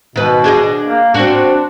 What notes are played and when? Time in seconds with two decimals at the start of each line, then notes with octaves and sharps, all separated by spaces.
0.16 B2 D#3 B4
0.44 D4 G#4 D#5
0.86 A#3
1.14 C4 D4 F#4